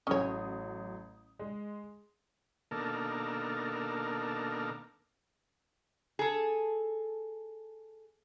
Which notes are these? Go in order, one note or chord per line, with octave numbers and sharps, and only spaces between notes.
A1 F#3 C#4 C#5 D#6
G#3
B2 D#3 A#3 D4 A4 A#4
G#4 A4